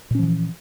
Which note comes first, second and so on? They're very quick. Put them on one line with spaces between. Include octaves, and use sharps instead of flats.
A#2 C#4 F3 E3